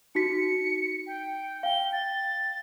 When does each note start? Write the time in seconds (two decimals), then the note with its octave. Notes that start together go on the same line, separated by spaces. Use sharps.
0.15 D#4 F#4 B6 C#7
1.07 G5
1.63 F5 G5 G7
1.93 A6